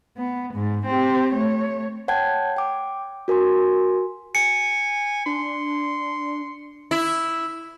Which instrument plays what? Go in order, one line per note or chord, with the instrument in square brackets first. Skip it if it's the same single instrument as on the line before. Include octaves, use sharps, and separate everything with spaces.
[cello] B3
G#2
C4 G4
A3 C#5
[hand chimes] C#5 F#5 G5 A5 G6 G#6
G5 D6
F#4 A#4 G#5 C6
[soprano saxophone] G#5 [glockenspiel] C#7
[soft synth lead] D4 [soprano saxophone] C6
[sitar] E4